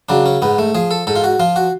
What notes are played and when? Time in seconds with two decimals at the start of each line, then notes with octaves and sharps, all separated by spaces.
0.09 C#3 F#3 D4
0.26 C#4
0.42 G#2 B3
0.58 A3
0.75 F3 G#4
0.91 A4
1.07 G#2 A4
1.16 F4
1.24 F#4
1.40 F3 F4
1.56 F#4